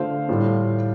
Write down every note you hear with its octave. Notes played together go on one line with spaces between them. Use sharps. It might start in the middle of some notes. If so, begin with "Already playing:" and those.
Already playing: D3 A3 F4 C5 F5
A2 G3 F4 A4